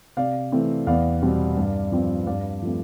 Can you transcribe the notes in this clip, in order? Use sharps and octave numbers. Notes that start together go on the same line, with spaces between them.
C3 D5 F5
E3 A3 C4
E2 D5 F5
B2 G3 C4
G2
F3 C4
G2 D5 F5
F3 A3 C4